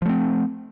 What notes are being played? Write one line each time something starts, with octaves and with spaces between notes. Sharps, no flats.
F3 A3 C4